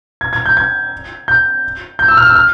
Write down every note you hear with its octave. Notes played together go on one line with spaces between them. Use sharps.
G#6
G#6
G6
G#6
G6
G6
E6
F6
E6
F6